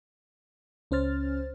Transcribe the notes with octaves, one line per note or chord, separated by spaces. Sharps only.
C#2 C#4 C5 F6 A6